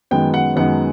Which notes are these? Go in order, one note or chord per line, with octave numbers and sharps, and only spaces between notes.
F#2 D#3 G#3 B3 G5
F#5
F#2 D#3 G#3 B3 F#5